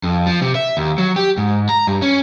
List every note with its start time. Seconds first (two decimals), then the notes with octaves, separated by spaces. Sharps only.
0.03 F2
0.27 F3
0.41 C3
0.55 E5
0.77 D#2
0.98 F#3
1.16 G4
1.38 G#2
1.69 A#5
1.87 G2
2.02 C#4